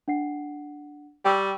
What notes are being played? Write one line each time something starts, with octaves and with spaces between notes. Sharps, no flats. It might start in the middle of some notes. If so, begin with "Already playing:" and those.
D4 F#5 C7
G3 G5 C#6 E6